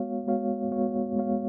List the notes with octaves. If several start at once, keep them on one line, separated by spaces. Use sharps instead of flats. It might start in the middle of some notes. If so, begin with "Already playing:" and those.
Already playing: G#3 B3 F#4 C#5 F5
G#3 B3 F#4 C#5 F5
G#3 B3 F#4 C#5 F5
G#3 B3 F#4 C#5 F5